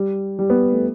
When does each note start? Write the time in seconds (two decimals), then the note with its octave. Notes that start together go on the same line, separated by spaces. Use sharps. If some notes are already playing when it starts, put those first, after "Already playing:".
Already playing: G3
0.39 G3
0.50 B3
0.72 A3